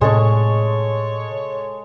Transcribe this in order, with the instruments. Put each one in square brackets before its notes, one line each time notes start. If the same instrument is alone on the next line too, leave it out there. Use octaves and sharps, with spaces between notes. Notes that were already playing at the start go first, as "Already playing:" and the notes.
[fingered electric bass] A2 C3 [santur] G#3 A4 C#6 [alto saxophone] C#5